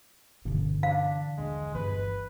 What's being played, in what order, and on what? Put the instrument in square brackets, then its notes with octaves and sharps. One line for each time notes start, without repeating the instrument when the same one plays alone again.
[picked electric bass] G2 B2 C#4 [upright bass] D3 E3
[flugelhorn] D4 [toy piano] F5
[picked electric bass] D#1 A#1 D4 [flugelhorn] G#3
[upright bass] G1 [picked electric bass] E3 [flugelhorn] B4